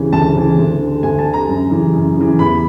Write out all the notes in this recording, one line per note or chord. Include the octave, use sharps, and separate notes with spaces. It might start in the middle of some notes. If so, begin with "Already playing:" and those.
Already playing: D2 C#3 E3
D2 A5
C#3 E3
D2
D3
D2 G#5
A5
D3
A#5
F#2
C#3 E3
F#2
C#3 E3
E2 B5